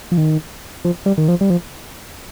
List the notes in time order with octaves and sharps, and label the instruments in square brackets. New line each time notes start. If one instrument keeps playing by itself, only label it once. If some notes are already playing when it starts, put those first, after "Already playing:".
[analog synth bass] F3
D#3
F3
G3
D#3
F3
G3
F3